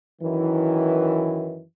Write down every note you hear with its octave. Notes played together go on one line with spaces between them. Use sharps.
F#2 D#3 E3